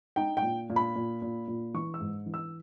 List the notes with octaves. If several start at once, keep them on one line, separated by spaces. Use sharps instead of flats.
D#4 G5
G5
A#2
A#2
B5
A#2
A#2
A#2
E3 C#6
E6
G#2
E3
E6